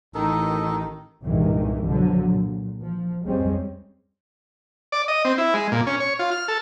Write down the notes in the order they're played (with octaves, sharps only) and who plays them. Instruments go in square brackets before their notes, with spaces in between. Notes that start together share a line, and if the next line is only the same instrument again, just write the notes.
[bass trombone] A1 [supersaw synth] D#3 [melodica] D#4 A4
[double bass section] C2 G2 A#2 D#3 E3 G#3
B2 D3 F3 F#3
A#2
F3
F2 G3 G#3 C4 C#4
[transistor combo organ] D5
D#5
C4
E4
G#3
A#2
C#4
C#5
F4
F6
A4